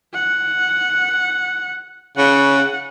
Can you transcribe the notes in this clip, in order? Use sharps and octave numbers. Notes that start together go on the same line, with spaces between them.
F#5
C#3 F#5